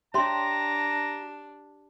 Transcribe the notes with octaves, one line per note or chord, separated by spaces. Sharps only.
D4 G4 C#5 E5 A#5 C6